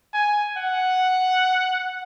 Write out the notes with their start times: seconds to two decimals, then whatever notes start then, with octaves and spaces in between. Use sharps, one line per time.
0.14 G#5
0.58 F#5